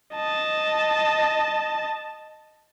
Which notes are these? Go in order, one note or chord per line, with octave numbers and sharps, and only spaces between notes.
D#5 A5